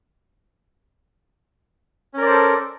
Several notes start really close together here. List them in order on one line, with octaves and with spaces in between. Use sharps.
C#4 A#4 D5 C5 A4